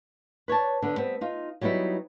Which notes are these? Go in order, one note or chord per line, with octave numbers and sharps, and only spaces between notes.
B4 C#5 D5 A5
D3 B3
G3 B3 C4
D#4 F4
F#3 G3 B3 D#4 E4